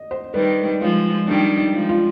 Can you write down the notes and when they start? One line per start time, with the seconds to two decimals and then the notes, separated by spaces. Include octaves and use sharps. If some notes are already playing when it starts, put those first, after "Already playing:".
Already playing: D#5
0.11 C5
0.34 D#3 G3 B4
0.81 F3 G#3 F4
1.27 D#3 G3 D4
1.58 D#4
1.74 F3 G#3
1.89 F4